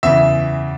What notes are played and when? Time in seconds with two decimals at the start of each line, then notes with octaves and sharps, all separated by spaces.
0.03 E2 C#3 E3 E5